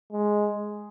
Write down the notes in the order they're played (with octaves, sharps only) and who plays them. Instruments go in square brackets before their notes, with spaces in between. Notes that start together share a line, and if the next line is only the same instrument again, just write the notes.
[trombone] G#3